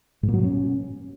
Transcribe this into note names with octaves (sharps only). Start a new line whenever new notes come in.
G#2
A#2
F#3
B2
C#4